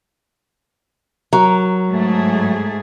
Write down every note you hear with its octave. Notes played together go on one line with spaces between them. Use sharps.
F#3 A#4
G#2 A3 G#4